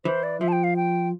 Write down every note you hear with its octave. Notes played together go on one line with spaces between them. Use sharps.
E3 C5
D5
F3 E5
A5
G5
F5
G5